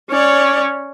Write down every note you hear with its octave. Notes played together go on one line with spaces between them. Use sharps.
C#4 C#5 D5